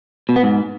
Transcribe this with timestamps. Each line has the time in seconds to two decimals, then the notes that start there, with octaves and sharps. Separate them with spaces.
0.29 B2
0.36 B3
0.43 G#2